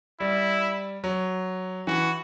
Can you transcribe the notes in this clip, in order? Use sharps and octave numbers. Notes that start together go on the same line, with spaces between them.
G3 E4
F#3
E3 F#4